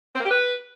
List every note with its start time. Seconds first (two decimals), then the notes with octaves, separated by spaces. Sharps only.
0.14 C4
0.19 A#3
0.25 G4
0.30 B4